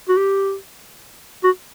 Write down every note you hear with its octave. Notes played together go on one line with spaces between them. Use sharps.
F#4
G4
F#4